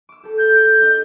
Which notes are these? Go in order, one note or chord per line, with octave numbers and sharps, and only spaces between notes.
D6 E6
G4 A4
G6
D7
D4 G4 D#5